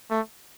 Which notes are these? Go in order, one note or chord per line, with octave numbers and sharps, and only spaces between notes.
A3